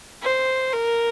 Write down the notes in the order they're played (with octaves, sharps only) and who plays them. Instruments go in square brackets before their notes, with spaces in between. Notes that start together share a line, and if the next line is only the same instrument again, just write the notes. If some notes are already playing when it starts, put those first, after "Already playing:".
[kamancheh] C5
A#4